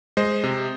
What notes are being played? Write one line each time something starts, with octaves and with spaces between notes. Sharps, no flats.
G#3 C5 D#5
C3